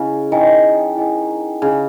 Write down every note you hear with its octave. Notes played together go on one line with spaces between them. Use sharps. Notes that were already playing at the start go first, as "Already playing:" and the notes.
Already playing: C#3 E4 G#4 D#5 G#5
D#3 E4 G#4 D#5 G#5
E4 G#4 D#5 G#5
C#3 E4 G#4 D#5 G#5